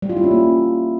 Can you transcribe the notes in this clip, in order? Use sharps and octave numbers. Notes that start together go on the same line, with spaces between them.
G3
F4
E4
C#4
A#3